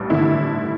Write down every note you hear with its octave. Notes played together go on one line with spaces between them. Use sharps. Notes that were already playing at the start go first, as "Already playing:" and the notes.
Already playing: A1 G2
D3 E4